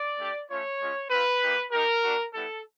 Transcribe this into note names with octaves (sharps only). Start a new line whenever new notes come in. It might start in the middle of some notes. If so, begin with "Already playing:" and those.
Already playing: D5
A3 D4 G4
A3 C#4 F4 C#5
G#3 C#4 F4
C4 F4 B4
A#3 D#4 G4
A#3 D#4 G4 A#4
A#3 D4 F#4
G3 B3 E4 A4